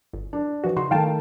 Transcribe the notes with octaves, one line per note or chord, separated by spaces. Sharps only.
G1
D4
E3 F3 F#4
C#3 D#4 F#4 C6
D#3 A3 F5 G5 A5